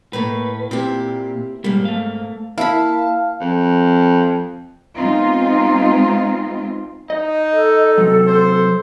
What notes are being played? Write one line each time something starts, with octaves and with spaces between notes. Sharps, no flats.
A2 A3 A#3 B4
A#2 A#3 C4 E4 G4
G#2 G3 A#3
A3 F5
A#3 E4 F5 A5 B5
F2
G#3 B3 C4 D#4 F4
D#4 D#5
A4
C3 F#3
C5